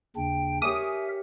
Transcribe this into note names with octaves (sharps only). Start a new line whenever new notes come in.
D#2 C#3 D4 G5
G4 A#4 C#5 E5 G#5 D6 D#6